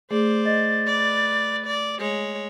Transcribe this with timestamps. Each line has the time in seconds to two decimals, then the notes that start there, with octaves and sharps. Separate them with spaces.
0.11 A3 G#4 C5 D5
0.46 D#5 A6
0.87 B4 D5
1.66 D5
1.99 G#3 C#5